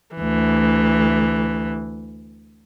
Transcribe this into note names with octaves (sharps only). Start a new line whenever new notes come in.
D2 E3